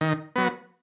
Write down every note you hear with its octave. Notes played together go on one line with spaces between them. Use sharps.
D#3
F#3 B3